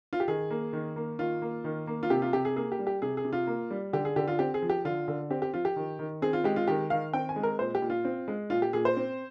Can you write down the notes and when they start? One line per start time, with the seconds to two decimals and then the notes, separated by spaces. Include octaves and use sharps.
0.13 F4
0.20 G4
0.28 D#3 G#4
0.51 A#3
0.73 D#3
0.96 A#3
1.19 D#3 F4
1.42 A#3
1.64 D#3
1.87 A#3
2.03 F4
2.10 C3 G4
2.22 F4
2.33 C3 G4
2.45 G#4
2.56 A#3 G#4
2.72 G4
2.79 G3
2.87 G4
3.02 C3 G#4
3.17 G#4
3.25 C3
3.33 F4
3.47 A#3
3.71 G3
3.93 D3 G4
4.05 G#4
4.16 D3 G4
4.28 F4
4.39 C4 G4
4.54 G#4
4.62 F3
4.70 G4
4.85 D3 F4
5.08 D3
5.30 C4 G4
5.42 G4
5.54 F3 F4
5.65 G4
5.76 D#3
5.99 D#3
6.22 C4 G#4
6.33 F4
6.44 G#3 G4
6.56 F4
6.68 D#3 G4
6.90 D#3 F5
7.13 C4 G5
7.29 G#5
7.36 G#3
7.43 A#4
7.59 A#2 C5
7.75 G4
7.82 A#2
7.90 F4
8.05 C4
8.28 G#3
8.50 A#2 F4
8.62 G4
8.73 A#2 G#4
8.85 C5
8.97 C4